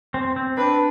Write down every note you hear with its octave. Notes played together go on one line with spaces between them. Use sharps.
C4
C4
D4 B4